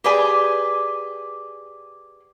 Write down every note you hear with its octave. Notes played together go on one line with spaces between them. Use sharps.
G4 G#4 B4 D5 G#5